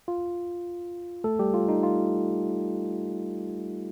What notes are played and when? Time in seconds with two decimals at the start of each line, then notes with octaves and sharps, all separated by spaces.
0.08 F4
1.24 A3 A4
1.39 G3 G4
1.54 F4
1.69 D#4
1.83 F4